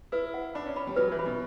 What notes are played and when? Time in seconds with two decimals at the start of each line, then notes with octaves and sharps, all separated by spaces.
0.12 E4 B4
0.34 F#5
0.55 D4 B5
0.66 C#4
0.76 C#4 B5
0.87 G3
0.97 F#3 B4
1.12 E3
1.19 B5
1.26 B2